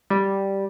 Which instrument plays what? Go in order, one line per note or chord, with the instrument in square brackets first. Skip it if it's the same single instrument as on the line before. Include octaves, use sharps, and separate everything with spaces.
[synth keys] G3